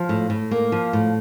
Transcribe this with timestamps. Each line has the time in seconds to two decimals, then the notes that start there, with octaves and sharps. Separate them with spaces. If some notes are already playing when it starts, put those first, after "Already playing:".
Already playing: F3 F5
0.09 A2
0.30 A2
0.51 A#3
0.72 F3
0.93 A2